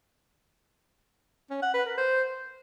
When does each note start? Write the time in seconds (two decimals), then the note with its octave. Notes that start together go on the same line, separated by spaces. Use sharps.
1.50 C#4
1.62 F#5
1.74 B4
1.86 A#4
1.97 C5